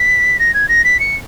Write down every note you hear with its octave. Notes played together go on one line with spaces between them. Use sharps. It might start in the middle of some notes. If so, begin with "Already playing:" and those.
Already playing: B6
A#6
G#6
A#6
B6
C#7